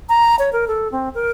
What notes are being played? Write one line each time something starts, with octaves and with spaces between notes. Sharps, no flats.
A#5
C#5
A#4
A4
C4
A#4